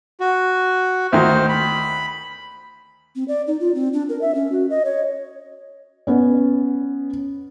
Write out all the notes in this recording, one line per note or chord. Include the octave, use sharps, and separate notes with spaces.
F#4
D2 D#3 F#4 C5 F6
B5
C4
D5
D#4
F4
C4
D4
A#4
E5
C#4
F#4
D#5
C#5
B3 C#4